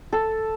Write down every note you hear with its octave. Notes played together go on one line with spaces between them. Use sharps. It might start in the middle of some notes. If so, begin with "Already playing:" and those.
A4